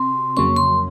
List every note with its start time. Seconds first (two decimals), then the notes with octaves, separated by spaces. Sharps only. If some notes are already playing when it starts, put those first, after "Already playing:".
Already playing: C3 C4 F#4 C6
0.37 F2 C#3 F#3 A#3 C#4 C#6
0.57 C6